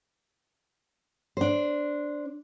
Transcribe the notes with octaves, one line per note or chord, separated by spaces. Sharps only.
D4 C5